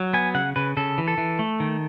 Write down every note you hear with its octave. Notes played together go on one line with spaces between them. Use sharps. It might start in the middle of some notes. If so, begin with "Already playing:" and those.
Already playing: F#3
B3 G#5
C#3 F#5
C#3 B4
C#3 A4
E3
A4
E3
A3
D#3